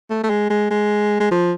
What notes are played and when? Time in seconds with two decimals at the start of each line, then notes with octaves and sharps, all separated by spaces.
0.10 A3
0.24 A3
0.30 G#3
0.50 G#3
0.71 G#3
1.20 G#3
1.31 F3